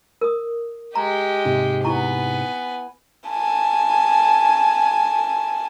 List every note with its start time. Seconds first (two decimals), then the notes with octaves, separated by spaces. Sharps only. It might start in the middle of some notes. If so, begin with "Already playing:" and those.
0.21 A#4 D#6
0.95 G#3 G4 A#5
1.45 G#2 C3 D#4
1.85 B3 E4 G#5 A#5 C#6
3.29 G#5 A5